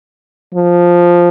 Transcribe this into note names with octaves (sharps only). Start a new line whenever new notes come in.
F3